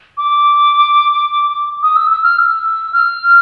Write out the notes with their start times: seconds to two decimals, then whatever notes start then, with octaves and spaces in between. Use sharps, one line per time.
0.18 D6
1.83 D#6
1.96 E6
2.11 E6
2.23 F6
2.38 E6
2.93 F6